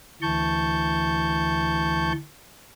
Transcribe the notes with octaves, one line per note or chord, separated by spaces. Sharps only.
D2 E3 A5 C#6 G6